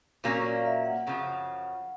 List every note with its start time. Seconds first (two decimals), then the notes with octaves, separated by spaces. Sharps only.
0.24 A#2 F#3 A#3 C#4 C#5
0.44 D5
0.65 E5
0.85 F#5
1.07 F#2 C#3 F3